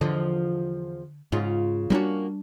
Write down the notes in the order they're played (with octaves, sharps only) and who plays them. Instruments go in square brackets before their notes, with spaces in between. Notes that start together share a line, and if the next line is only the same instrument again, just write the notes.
[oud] E2 F3 D#5 [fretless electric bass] D3
[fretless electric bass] G#2 [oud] C#3 F4
[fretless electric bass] G3 B3 D4 [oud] A#3 C#4 F#4